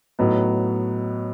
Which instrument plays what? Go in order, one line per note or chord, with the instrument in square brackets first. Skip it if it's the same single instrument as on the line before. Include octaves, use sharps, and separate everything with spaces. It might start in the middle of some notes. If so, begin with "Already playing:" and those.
[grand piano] A2 F#3 B3 D#4